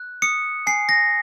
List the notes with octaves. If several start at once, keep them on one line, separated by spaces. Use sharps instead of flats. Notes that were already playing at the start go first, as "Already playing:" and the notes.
Already playing: F#6
D#6 C#7
G#5 C7
A#6